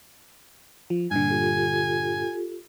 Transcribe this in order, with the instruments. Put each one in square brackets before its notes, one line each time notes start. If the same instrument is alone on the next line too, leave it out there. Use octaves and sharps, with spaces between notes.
[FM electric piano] F3
[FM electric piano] G2 A#2 D3 [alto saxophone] G#5
[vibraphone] F4 G4 A4